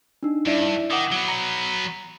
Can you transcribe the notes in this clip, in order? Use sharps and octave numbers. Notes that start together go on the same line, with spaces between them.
D4 D#4
G2 E4 D5 E5
D#3 F#5 D6 D#6
F#3 B3
A#5 A#6